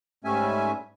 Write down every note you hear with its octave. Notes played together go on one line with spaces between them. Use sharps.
G#2 G3 A3 C#4 E5 G#5